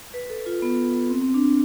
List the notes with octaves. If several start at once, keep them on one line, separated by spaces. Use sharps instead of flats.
B4
A4
F4
B3
C4
C4
D4